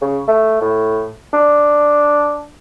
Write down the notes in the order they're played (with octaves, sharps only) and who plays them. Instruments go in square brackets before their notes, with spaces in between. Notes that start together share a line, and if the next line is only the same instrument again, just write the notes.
[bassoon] C#3
A3
A2
D4